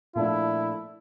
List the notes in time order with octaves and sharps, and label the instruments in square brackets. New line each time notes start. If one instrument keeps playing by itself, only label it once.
[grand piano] A#2 F3 A3 D4 [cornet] E4